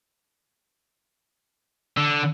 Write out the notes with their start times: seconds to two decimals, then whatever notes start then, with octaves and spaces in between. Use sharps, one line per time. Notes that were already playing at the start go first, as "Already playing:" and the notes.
1.97 D3